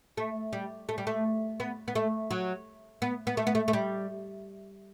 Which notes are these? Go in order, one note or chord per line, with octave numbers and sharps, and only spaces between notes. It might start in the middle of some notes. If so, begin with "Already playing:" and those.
A3
G3
A3
G3
A3
B3
B3
A3
F#3
B3
B3
A3
B3
A3
A3
G3